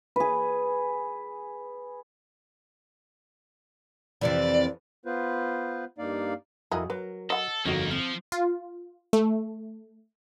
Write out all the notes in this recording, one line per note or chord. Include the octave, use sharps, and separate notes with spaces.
G#4 B4
F2 C3 E3 D5
B3 F4 B4 C5
G2 A#3 D#4 D5 F5
F2 E4 F#4 G#4 A#4 D#5
F#3 A#4 B4
A4 D#5 F#5
G1 F2 D#3 A#3 C#4 D#4 F#4
F3 C4
F4
A3